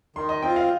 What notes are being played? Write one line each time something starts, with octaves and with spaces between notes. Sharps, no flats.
D#3 C6
D#5
C4 F4 G5
F5